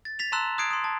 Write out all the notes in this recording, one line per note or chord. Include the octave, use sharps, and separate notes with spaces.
A6
A6 B6 F7
A5 A#5 C6 E6 F#6 E7
D#6 F#6 G#6 C7 D7
C6 D#6
A5